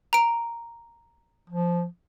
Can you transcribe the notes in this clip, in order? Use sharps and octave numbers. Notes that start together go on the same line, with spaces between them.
A#5 D7
F3